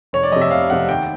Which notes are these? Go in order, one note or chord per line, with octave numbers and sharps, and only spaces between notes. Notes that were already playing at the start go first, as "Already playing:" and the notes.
F1 C#5
D5
F2 C3 D#5
E5
F1 F5
F2 C3 F#5
D#2 G5